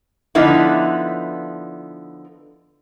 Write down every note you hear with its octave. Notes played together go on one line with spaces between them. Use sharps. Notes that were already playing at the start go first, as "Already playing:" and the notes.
D3 F3 B3 D#4 E4